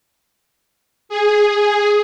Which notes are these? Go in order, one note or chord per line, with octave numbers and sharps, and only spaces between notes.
G#4